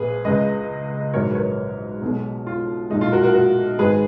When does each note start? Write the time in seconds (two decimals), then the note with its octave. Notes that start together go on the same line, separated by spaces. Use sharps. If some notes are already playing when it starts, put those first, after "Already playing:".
Already playing: A#1 A#2 G#4 B4
0.25 C#2 C#3 G#3 B4 D#5
1.13 A#1 G#2 F#3 A#4 C#5
1.31 B4
1.35 A#4 C#5
2.02 B1 B2 G#3
2.47 F4
2.90 B1 A#2 G#3 D#4
3.01 F4
3.12 F#4 A#4
3.23 F#4 A#4
3.34 F#4 A#4
3.78 G#1 G#2 D#3 G#3 G#4 B4